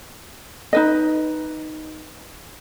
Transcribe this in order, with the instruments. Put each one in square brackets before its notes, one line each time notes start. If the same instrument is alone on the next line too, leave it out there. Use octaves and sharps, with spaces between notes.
[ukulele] D#4 B4 D#5